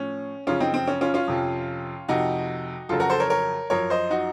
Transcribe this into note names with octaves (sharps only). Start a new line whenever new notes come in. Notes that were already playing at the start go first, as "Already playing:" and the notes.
Already playing: A2 F3 C#4
F#2 C#3 F3 C#4 F4
C4 D#4
C4
C#4
C#4 F4
C#4 F4
F2 C3 F3
F2 C3 F3 D#4 F#4
F2 C#3 F#3 F4 A4
F#4 A#4
A4 C5
A#4 C#5
A#4 C#5
F#2 F3 A#4 C#5
C5 D#5
D#4 F#4